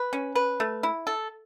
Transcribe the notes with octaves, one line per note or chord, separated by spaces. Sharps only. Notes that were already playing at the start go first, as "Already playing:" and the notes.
Already playing: B4
C#4
B4
A3
E4
A4